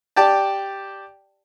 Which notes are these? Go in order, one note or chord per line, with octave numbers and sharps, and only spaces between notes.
G4 D5 G5 A5